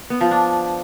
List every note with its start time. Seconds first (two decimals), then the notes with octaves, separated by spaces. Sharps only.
0.10 B3
0.21 F3
0.31 D4